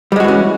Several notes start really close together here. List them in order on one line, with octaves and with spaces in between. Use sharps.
G3 G#3 F#4 E3 C#4